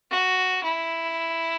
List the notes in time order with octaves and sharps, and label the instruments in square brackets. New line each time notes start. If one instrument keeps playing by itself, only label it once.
[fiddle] F#4
E4